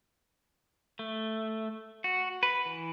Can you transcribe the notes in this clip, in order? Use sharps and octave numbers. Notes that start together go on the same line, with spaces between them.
A3
F#4
B4
E3